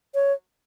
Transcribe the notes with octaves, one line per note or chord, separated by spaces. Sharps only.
C#5